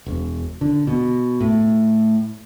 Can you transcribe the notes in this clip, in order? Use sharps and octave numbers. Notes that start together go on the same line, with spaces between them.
E1
D3
B2
A2